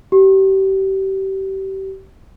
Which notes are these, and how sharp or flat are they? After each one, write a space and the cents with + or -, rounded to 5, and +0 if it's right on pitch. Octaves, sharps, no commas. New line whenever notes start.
G4 -30